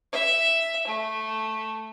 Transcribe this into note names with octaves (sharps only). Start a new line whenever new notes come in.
E5
A3